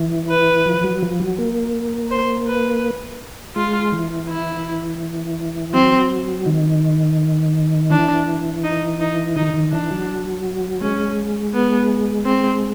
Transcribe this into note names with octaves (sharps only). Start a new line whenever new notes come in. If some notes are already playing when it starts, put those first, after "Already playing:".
Already playing: E3
B4
F3
F#3
F3
F#3
A#3
C5
B4
G#3 F4
E3
E4
F#3 C4
D#3
E3 D4
D#4
D#4
D#3 D#4
D#3
E3 D4
F#3
G#3 C#4
B3
C4